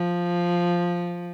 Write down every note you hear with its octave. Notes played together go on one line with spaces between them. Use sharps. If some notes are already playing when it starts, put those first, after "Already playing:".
Already playing: F3